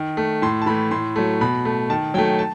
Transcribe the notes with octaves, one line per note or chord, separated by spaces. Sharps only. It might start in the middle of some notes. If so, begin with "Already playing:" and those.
Already playing: D#3
A3
A2 C6
A5
E3 A3 B5
A2 C6
F#3 A3
B2 B5
A3
D#3 A5
F#3 A3 G5
A5